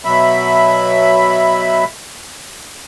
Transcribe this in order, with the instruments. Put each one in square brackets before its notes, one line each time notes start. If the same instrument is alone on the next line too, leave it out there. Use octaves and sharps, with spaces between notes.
[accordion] B2 F#3 E5 B5